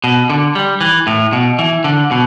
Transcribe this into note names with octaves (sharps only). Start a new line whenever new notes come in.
B2
D3
G3
E3
A2
B2
E3
D3
B2